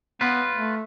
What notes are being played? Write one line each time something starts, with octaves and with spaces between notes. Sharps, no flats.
B3 F4 B4
A3